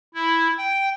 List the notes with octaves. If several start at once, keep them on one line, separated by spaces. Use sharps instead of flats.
E4
G5